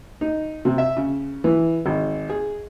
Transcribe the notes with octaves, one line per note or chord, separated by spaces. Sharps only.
D#4
C3
E5
C#3
E3
G#1
G#4